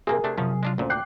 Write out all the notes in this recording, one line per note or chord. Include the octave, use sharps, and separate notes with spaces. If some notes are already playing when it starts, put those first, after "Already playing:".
C3 A#3 C4 G#4 A#4
C3 A3 D4
F#2 C3 F3 F#3 C#4
G#3 D4 F4
D2 A#2 C#4 C5
G5 D6 F#6 G6 C7